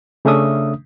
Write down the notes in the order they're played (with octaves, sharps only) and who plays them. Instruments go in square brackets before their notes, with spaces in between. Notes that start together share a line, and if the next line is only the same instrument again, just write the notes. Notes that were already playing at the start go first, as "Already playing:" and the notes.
[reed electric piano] C#3 A3 C#4 D4 E5 D#6